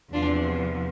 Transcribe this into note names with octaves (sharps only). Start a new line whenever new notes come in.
E2 C3 F3 D4 F4